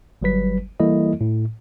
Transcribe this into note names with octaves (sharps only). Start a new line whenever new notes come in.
G1 F#3 G3 B4 B6
E3 G3 A#3 E4 A4 D#5
A2